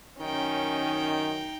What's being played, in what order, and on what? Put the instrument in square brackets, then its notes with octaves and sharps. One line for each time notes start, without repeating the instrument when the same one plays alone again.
[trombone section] F#2 D#3 [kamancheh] C#4 [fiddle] D#4 G5